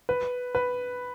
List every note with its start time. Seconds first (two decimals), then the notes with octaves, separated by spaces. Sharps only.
0.09 B4
0.55 B4